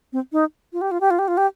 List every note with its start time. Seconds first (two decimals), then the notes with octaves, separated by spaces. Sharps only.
0.13 C4
0.32 D#4
0.73 F4
0.81 G4
0.91 F4
1.00 G4
1.10 F4
1.19 G4
1.28 F4
1.37 G4